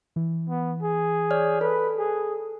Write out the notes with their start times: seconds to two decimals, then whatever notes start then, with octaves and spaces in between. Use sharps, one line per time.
0.16 E3
0.49 B3
0.83 G#4
1.31 C#5 D5 F6
1.61 A4 B4
1.98 G#4